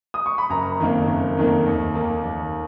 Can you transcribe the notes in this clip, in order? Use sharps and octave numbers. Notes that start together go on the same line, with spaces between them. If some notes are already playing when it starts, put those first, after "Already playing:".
D#6
C#6
B5
F#1 A#5
F2 D#3 A#3
F#1
F2 D#3 A#3
D#2
D#3 A#3
D#2